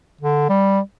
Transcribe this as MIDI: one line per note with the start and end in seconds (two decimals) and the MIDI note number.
0.21 0.47 50
0.49 0.79 55